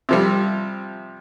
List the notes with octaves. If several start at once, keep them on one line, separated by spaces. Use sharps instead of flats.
C3 F3 G3